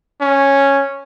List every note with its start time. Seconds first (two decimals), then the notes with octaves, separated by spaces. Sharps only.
0.21 C#4